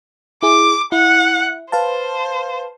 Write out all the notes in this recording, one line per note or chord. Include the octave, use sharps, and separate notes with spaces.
E4 G#4 D6
E4 F#5
B4 C5 F5 A5